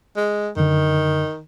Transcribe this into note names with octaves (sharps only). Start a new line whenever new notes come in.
G#3
F#2 D3 D#3